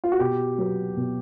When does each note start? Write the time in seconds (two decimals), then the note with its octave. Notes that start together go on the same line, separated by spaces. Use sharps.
0.04 F4
0.12 F#4
0.19 B2 G4
0.58 F#3 B3
0.97 B2